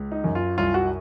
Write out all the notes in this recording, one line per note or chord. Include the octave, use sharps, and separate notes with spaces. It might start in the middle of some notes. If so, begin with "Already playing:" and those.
Already playing: C#2
D#4
F#2
F4
C2 F4
F#4